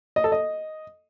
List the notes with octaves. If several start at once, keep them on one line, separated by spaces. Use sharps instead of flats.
D#5
A4
D#5